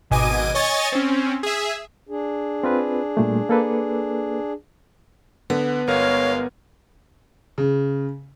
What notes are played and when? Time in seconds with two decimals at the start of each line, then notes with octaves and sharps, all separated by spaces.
0.10 G#1 B2 D#5 G#5 D6 D#7
0.54 C#5 D#5 G#5 C#6 A6
0.92 C4 C#4
1.43 G#4 E5
2.09 D4 G#4
2.64 C4 F4 B4
3.17 A#2 G3 A3
3.49 A#3 A4 B4
5.50 D3 B3
5.87 G1 G#3 F4 A#4 C#5 F5
7.58 C#3